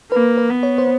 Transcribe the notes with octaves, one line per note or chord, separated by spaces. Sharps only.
A#3 B4
B4
B3
C#5
C5